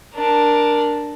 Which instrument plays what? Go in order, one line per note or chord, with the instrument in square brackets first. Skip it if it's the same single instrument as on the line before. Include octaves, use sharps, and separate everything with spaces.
[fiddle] D4 A#4